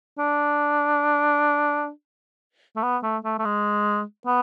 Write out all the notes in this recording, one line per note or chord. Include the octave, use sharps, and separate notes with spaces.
D4
A3
B3
A3
A3
A3
G#3
B3